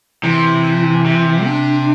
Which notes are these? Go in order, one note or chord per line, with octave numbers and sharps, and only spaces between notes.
C3 E3
C3
D4